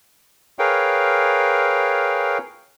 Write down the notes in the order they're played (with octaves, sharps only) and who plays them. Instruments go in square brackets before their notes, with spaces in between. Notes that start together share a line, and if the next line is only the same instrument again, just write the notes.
[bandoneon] G#4 A#4 B4 C#5 F5 G5